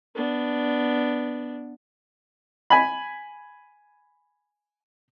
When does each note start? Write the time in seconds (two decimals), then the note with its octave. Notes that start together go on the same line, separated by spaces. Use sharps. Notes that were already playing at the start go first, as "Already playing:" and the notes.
0.16 B3 D4
2.70 G#5 B5